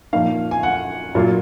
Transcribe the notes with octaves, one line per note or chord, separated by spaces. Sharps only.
A#2 F3 A#3 D#4 F5
G#5
F#5
A#2 F#3 A#3 F4